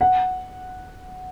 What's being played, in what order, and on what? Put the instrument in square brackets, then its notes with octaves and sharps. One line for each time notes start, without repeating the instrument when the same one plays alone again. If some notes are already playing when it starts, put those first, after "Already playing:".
[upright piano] F#5